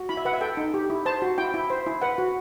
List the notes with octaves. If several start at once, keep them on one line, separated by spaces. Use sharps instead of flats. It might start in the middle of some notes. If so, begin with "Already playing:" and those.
Already playing: F#4
E4 B5
E5
B4 F#5
E5
A4 G5
D#4
G4
E4
C5 A5
F#4
E4 G5
E4
C5
E4
B4 F#5
F#4